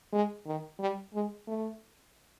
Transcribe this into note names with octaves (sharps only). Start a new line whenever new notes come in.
G#3
D#3
G3
G#3
A3